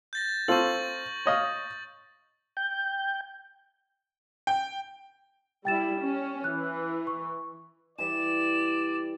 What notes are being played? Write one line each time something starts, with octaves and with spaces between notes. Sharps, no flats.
G6 A6 A#6
C4 F4 A4 C#6 F#7
C#5 D#5 F5
G5 G6
G5
G3 E4 G5 A6 E7
C#4
E3 F#6
C#6
E3 G3 D5 E5 E7